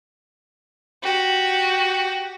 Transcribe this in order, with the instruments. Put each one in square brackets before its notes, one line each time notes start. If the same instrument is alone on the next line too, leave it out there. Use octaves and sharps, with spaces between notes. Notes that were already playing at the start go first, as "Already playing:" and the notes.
[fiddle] F#4 G4